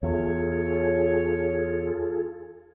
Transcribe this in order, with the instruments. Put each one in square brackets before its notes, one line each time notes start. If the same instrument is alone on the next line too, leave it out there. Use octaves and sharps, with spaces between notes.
[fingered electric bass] E2 [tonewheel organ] F4 G#4 A4 [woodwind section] C#5